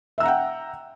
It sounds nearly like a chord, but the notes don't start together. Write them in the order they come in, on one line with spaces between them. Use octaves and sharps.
E5 E6 A#5 F#5 G5